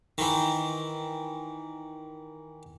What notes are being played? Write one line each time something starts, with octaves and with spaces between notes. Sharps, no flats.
D#3 E3